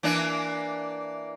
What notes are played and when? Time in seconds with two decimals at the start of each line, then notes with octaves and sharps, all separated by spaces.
0.03 E3 A#3 D4